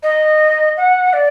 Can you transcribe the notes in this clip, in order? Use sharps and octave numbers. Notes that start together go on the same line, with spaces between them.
D#5
F#5
D5